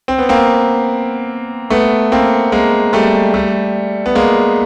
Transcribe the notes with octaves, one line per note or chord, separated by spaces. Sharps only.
C4
B3
A#3 C4
A3 B3
A#3 C4
G#3 A#3
G3 A3
G3 A3
B3
G#3 A#3